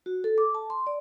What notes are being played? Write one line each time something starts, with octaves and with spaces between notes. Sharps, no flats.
F#4
A4
D6
A5
C6
D5